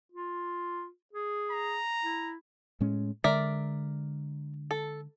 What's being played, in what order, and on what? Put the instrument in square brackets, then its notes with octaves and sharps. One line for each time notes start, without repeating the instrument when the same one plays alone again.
[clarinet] F4
G#4
[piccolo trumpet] A#5
[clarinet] E4
[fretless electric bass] A2 G#3 C#4
[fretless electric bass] D3 G#3 [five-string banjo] A#4 D5 E5
[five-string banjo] A4